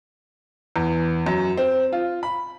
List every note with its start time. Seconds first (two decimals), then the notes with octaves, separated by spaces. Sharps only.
0.76 E2
1.26 F#2
1.58 C4
1.93 F4
2.23 B5